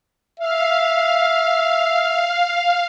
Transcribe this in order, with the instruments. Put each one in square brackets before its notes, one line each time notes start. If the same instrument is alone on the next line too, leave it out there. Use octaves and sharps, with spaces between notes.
[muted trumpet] E5 [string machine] F5